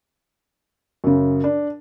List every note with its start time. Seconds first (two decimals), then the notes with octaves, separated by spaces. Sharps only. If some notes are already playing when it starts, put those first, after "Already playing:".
1.04 F#2 C#3
1.44 D4